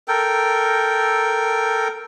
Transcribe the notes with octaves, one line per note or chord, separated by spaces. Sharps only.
A4 A#4 G5